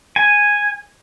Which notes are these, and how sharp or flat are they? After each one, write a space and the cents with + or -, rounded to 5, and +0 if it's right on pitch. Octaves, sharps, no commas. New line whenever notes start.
G#5 -5